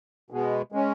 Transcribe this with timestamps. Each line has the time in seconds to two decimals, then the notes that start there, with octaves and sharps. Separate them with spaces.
0.30 B2 G#3 B3
0.72 G#3 C#4